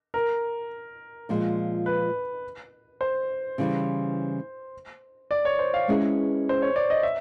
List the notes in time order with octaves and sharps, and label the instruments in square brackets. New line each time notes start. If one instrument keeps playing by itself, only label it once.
[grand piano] A#4
[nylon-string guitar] A#2 F3 G#3
[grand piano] B4
C5
[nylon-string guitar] C#3 E3 G3
[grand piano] D5
C#5
C5
F5
[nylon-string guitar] G#3 C#4 E4 G#4 B4
[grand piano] C5
C#5
D5
D#5
E5